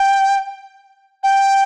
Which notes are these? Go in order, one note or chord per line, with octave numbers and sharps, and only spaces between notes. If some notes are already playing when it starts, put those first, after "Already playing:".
Already playing: G5
G5